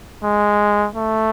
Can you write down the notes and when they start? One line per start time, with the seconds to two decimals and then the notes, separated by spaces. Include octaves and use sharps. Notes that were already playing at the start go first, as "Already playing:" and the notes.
0.24 G#3
0.95 A3